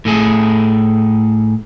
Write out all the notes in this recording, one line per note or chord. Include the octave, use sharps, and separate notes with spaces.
A2 A3 G#4 A4